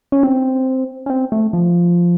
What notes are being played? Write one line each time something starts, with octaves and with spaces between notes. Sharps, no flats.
C#4
C4
C#4
C4
A3
F3